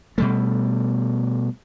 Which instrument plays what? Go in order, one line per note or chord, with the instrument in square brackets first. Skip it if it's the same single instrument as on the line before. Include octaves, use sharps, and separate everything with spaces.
[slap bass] B2 G3 A3